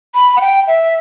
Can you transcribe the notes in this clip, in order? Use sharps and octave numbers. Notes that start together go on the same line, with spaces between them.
B5
F#5
G5
E5